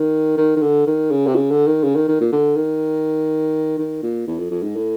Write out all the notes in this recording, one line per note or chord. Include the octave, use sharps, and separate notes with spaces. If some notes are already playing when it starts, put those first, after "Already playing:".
Already playing: D#3
D#3
D#3
D3
D#3
C#3
C3
C#3
D3
D#3
C#3
D#3
D#3
A#2
D3
D#3
D#3
A#2
E2
F2
F2
G#2
A2